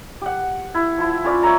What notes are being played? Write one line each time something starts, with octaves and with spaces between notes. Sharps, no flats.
G4 F#5
E4
F3 E4
C#4 F4 B4 D5
C#5 E5 A#5 C6